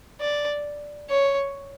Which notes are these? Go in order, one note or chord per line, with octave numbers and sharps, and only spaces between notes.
D5
C#5